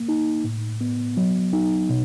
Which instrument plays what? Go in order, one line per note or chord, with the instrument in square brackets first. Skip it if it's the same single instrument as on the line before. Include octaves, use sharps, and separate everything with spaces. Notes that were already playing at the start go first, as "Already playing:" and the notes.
Already playing: [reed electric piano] A#3
D#4
A2
B3
F#3
D#4
B2